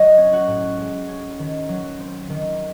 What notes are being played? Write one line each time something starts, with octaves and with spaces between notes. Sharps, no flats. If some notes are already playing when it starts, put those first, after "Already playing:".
Already playing: F#3 D#5
C#4
F#4
A2
G#3
C#4
D#3
F#3
C4
D#3